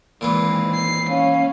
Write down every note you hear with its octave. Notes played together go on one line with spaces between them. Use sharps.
A#2 D#3 E3 G#3 C4 F4
C7
C#4 F5